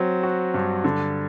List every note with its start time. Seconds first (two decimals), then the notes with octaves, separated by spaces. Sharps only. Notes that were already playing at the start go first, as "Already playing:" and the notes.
Already playing: F#3 C4
0.23 F#4
0.54 G2
0.84 D3